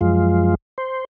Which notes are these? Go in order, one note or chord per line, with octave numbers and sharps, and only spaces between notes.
F#2 F3 G#3 F4
C5